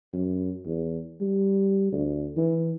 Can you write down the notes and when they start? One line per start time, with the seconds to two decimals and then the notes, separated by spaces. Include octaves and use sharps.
0.13 F#2
0.65 E2
1.21 G3
1.92 D2
2.37 E3